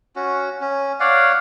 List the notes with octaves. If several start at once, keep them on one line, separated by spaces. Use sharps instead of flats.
C#4 F#4
C#4
C#5 D5 F5 F#5